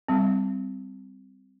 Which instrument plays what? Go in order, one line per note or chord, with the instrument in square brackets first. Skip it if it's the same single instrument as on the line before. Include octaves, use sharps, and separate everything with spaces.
[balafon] G3 C4